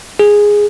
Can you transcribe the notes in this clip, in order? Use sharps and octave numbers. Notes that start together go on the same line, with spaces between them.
G#4